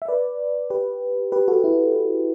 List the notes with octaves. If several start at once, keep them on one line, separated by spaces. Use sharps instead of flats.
E5
B4 D5
G4 B4
G4 B4
F#4 A4
E4